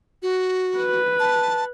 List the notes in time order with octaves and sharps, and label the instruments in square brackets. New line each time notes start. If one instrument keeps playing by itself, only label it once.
[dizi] F#4
[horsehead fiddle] B4
[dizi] A5